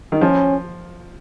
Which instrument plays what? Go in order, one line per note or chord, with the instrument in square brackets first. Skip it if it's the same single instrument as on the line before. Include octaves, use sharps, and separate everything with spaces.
[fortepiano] D#3
[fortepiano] F3 [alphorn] C#4